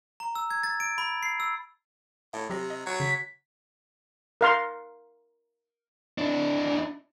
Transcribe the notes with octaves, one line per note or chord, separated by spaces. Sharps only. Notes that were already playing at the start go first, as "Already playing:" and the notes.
A#5
E6
G#6
A6
D7
B5
C7
E6
A2 E5
C3 F#3 G4 A#6
D#5
F#3
C#3 B6
A#4 F5 C6
D4 E4